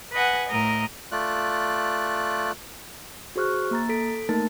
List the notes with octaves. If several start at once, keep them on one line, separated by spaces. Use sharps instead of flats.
B4 D#5 F#5 G#5
A2 A#4 D#5
A3 F4 D5 F#6
F#4 G#4 C5 C#6 F6 F#6
A#3 A#5 A6
A4 B6 D7
A3 A#3 D#4 A#4 A5 A6